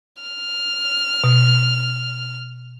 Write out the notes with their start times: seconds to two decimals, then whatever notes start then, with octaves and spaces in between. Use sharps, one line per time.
0.23 F6
1.24 B2